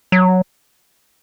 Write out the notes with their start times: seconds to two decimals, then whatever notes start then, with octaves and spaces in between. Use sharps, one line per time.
0.12 F#3